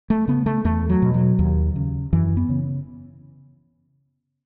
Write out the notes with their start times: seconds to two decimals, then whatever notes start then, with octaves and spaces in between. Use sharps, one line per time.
0.10 A3
0.28 C#3 B3
0.46 A3
0.65 E2 A3
0.90 F#3
1.02 B2
1.14 F#3
1.39 D#2
1.76 C#3
2.13 F#2 E3
2.37 B3
2.49 C#3